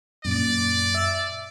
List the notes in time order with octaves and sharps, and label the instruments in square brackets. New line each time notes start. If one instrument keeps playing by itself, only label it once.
[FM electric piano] F#2 A#2 [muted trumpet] D5
[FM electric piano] E5 E6